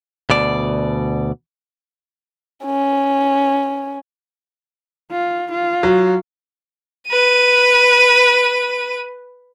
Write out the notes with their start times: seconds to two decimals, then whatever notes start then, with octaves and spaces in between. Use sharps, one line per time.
0.30 D2 B2 D5
2.65 C#4
5.11 F4
5.51 F4
5.83 F#3
7.09 B4 D#7